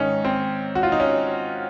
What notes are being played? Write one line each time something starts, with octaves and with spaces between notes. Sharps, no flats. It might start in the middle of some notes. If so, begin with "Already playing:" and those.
Already playing: G#2 D#3 C#4 D#4
C4
F#4
F4
D#4
C#4